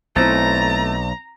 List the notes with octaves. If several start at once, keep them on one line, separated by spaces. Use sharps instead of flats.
B1 A3 C4 E4 A#5